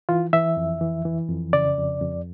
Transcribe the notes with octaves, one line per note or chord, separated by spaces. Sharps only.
E3 F4
E3 E5
F2
E3
E3
F2
C#3 D5
F2
F2